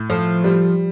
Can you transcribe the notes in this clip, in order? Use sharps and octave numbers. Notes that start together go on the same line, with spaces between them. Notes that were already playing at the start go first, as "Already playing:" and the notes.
Already playing: A2
F3 A4
G3